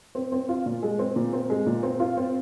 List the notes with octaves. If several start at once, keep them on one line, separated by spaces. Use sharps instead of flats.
C4
C4
F4
A#2
G#3
C4
A#2
C4
G#3
A#2
C4
F4
C4